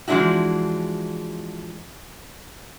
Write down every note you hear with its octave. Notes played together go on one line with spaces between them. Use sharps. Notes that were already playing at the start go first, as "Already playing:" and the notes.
E3 F3 G#3 D4 E4 F#4